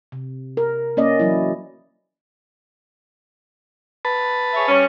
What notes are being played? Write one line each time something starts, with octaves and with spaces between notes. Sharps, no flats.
C3
A#4
A#3 C#4 D5 D#5
E3 F#3 E4
B4 A5
G#4 C#5 E5
G3 C#4